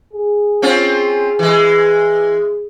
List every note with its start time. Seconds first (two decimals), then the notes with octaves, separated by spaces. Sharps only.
0.13 G#4
0.62 C4 C#4 F4
1.39 E3 G#3